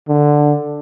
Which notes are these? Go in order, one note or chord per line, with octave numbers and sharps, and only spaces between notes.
D3